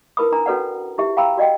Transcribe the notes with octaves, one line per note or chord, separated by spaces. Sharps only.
E4 A#4 B4 B5 D#6
D4 A#5
C#4 F#4 A4 B4 D5 F#5
E4 G4 E5
F5 G5 A#5 B5 E6
F#4 D5 D#5 F#5 G5